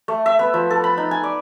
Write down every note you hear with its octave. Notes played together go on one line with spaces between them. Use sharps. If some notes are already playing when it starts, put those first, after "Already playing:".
A3
E5
B3
F3
A4
B5
D#4
G#5
D5